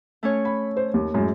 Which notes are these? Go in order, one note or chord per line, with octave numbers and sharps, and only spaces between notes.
A3 C#4 C#5
B5
C5
D#2
F#2 A2 G#3